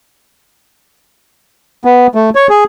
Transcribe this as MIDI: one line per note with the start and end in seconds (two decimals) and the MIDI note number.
1.85 2.07 59
2.15 2.30 57
2.35 2.47 73
2.50 2.64 68